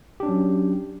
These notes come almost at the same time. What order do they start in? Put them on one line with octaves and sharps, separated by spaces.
G4 D4 C#4 F#3